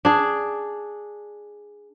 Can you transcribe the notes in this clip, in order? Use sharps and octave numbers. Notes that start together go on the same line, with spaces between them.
D4 G#4